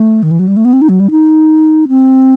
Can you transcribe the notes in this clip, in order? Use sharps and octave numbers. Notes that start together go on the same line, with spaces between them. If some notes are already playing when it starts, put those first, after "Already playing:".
Already playing: A3
D#3
E3
F#3
G3
A3
B3
C4
D#4
F#3
G3
D#4
C4